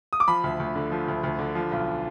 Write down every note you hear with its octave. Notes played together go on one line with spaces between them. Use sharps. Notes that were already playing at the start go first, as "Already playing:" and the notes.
D#6
D6
F3 B5
D2
D2
D3
F3
D2
D2
D3
F3
B1